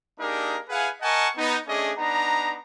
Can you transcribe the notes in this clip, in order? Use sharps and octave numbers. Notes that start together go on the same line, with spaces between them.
A#3 D4 D#4 G4 G#4 A#4
E4 G#4 B4 F5 F#5 G#5
A#4 D#5 F#5 G#5 A5 C#6
B3 D#4
A3 C#4 D4 G#4 D5 D#5
B3 D4 D#4 A#5